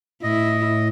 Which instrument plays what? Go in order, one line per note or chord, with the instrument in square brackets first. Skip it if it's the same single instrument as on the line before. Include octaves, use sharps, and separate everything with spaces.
[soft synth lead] A2 [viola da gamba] E4 [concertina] D#5